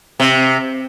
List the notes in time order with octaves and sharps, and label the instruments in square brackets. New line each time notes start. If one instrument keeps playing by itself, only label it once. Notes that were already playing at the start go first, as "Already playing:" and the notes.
[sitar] C3